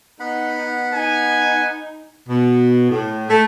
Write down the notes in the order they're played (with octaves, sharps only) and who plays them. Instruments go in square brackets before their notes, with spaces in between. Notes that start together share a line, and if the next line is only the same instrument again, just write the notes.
[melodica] B3 F#5 B5 [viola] D#4
[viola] D#4 [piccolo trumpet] G#5
[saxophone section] B2
A2
A3